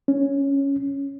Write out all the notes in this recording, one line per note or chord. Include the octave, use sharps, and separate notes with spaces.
C#4